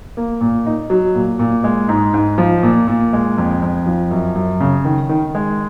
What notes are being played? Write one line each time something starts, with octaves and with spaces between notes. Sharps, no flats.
A#3
A#2
D#4
F#3
A#2
A#2
G#3
G#2
G#2
F3
A#2
A#2
G#3
F2
F2
F3
F#2
F#2
C#3
D#3
D#3
G#3